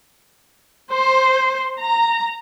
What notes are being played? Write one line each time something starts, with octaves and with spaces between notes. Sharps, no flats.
C5
A#5